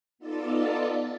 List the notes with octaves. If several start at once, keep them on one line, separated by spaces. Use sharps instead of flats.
B3 D#4 F4 A4 D5 A5